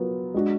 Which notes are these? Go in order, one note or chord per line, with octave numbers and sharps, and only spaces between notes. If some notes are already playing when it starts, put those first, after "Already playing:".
Already playing: F#3 B3 F4 A#4
G#3 D4 F#4